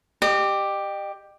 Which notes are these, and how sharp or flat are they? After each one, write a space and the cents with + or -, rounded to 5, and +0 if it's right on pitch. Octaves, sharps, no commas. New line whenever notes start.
G4 +5 D#5 -40